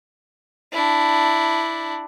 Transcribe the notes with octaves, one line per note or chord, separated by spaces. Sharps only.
D4 E4